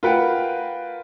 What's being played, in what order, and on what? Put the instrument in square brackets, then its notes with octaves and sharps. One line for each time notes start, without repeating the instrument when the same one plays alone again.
[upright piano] F4 A#4 B4 F#5 G5